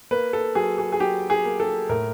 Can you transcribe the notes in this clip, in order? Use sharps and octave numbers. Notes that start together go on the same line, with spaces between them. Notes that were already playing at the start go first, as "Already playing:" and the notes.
A#3 B4
A4
F#3 G#4
G#4
G#4
F#3 G4
G#4
A#3
A4
A2 A#4